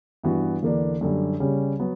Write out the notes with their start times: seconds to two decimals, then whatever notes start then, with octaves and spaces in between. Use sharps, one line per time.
0.24 G2 E3 B3 F#4
0.63 E2 D3 A#3 D4
1.01 F#2 D3 G3
1.40 C#3 G3 C#4
1.80 F#3 B3